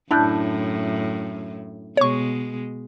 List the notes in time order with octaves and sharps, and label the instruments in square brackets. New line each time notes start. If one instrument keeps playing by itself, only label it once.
[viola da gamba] F#2 A2 [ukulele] D4 E4 [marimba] A5 F#6 G6
[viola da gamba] B2 G#3 [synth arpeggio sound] C#5 C#6